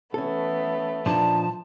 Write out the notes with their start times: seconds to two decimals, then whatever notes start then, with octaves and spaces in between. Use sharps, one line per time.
0.14 E3 A3 B3 C#4 A4
1.06 A#2 F3 D4 D#4 A5